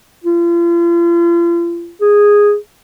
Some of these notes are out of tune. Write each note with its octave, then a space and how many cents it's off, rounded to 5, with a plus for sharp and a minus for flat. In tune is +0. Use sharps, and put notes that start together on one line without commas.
F4 -40
G#4 -10